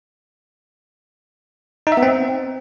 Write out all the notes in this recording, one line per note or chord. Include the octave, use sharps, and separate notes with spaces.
D#4
E5
B3
C4